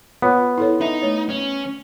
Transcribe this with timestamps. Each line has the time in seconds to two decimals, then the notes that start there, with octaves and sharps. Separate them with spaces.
0.22 B3 F4 C#5
0.58 E4 A4 C#5
0.81 D#4 E5
1.02 A3 C#5
1.29 C#4